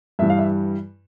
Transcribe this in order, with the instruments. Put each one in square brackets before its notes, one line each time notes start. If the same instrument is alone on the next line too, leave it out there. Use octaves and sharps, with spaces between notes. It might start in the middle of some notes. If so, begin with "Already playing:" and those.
[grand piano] G2 E3 G3 E5
F5
E5